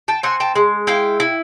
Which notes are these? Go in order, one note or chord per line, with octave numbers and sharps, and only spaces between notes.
G5 A5
C4 F#5 G#5
G5 A5
G#3
E4 F5 G5
E4